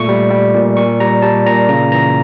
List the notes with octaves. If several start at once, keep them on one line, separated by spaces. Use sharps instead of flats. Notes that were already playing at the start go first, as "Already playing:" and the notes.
Already playing: A#2 A3 C#6
G3
G3
A#2
A#2 C#6
G3 A#5
G3 A5
A#2 A#5
C#3 A#5
E3 A#5